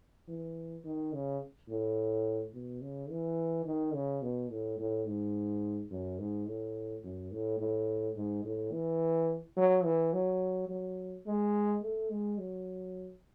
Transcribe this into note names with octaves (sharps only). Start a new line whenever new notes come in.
E3
D#3
C#3
A2
B2
C#3
E3
D#3
C#3
B2
A2
A2
G#2
F#2
G#2
A2
F#2
A2
A2
G#2
A2
E3
F#3
E3
F#3
F#3
G#3
A3
G#3
F#3